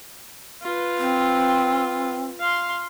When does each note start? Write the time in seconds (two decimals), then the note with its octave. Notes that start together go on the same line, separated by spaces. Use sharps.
0.62 F4 B4
0.98 C4
2.40 F5 C6